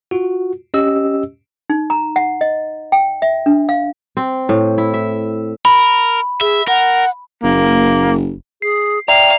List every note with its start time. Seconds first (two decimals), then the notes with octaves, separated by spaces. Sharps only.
0.11 F4 F#4
0.74 C#4 G4 D#5 E6
1.70 D#4
1.90 A#5
2.16 F#5
2.41 D#5
2.92 G5
3.22 E5
3.46 D4
3.69 F5
4.17 C4
4.49 A2
4.78 E4
4.93 E5
5.65 A#4 B5
6.41 G#4 E5
6.68 A#4 F#5
7.43 F#1 A#3
8.62 G#4 C7
9.08 D5 E5 F5 G5 A#5 F7